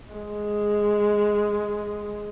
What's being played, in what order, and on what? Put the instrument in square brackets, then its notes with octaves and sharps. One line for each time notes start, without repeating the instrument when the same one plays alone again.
[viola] G#3